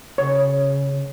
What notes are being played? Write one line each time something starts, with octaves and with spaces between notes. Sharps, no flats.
C#3 C#5